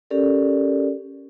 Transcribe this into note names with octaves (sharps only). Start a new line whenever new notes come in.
C#4 G4 A4 A#4 D5